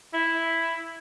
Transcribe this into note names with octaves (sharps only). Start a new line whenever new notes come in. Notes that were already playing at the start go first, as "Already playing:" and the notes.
E4